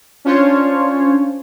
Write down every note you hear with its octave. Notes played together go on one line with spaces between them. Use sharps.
C#4 D4 F4 C5 C#5